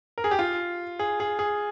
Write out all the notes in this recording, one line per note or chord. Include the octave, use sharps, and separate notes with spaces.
A#4
G#4
G4
F4
G#4
G#4
G#4